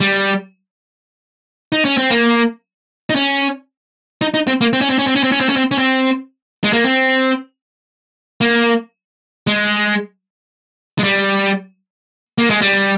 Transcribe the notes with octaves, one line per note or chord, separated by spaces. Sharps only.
G3
D#4
C#4
C4
A#3
D#4
C#4
D#4
D#4
C4
A#3
C4
C#4
C4
C#4
C4
C#4
C4
C#4
C4
C#4
C4
C#4
C4
G#3
A#3
C4
A#3
G#3
G#3
G3
A#3
G#3
G3